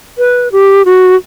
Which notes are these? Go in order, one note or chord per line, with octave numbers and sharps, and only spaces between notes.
B4
G4
F#4